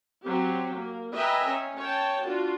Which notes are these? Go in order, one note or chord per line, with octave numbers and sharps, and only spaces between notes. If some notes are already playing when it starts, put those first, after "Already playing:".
F#3 C4 G4
A#3
B4 D#5 E5 G5 G#5 A#5
C#4
C#5 G5 A5
D4 F4 F#4